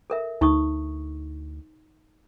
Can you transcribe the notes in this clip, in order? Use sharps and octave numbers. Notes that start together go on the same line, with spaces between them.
A4 A#4 E5
D2 D#4 C#6 D#6